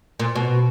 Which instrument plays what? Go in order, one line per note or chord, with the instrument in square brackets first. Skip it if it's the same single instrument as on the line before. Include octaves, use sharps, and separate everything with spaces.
[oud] A#2
B2